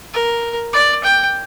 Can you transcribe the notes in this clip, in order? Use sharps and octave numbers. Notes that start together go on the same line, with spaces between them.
A#4
D5
G5